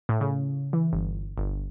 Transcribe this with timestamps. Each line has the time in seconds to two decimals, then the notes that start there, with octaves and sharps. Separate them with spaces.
0.09 A2
0.21 C#3
0.73 E3
0.93 G1
1.38 G1